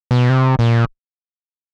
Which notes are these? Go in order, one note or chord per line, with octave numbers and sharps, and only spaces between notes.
B2
C3
A#2